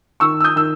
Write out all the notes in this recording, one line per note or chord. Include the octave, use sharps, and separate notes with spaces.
D#3 C#6 E6
E6
D#6 G6
D#3 E6